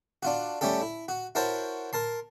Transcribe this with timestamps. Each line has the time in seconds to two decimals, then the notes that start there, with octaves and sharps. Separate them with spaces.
0.23 D4 F4 F#4
0.61 G3 A3 C#4 G4 A4
0.82 E4
1.08 F#4
1.35 E4 F#4 A#4 C5 C#5 A5
1.93 A#4 A5 C6